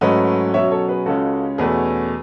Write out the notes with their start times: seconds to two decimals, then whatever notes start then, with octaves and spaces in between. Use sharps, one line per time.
0.01 G#2 F#3 A3 C#4 B4 D#5
0.54 B2 F#3 C#4 C#5 E5
0.71 A4 C#5
0.88 G#4 B4
1.06 C#2 C#3 G#3 C#4 F#4 A4
1.58 E2 B2 A3 C#4 G#4 B4